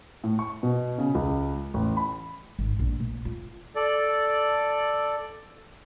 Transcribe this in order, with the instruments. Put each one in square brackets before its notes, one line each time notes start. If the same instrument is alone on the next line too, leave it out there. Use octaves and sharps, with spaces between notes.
[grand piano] A2
C#6
B2
C#3
C#2
A1
B5
[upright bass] G#1
A#1
A#2
F4
[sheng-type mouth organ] A4 D5